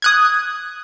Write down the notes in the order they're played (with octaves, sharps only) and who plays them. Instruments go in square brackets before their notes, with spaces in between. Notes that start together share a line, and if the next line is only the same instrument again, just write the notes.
[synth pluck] D#6 F#6 G#6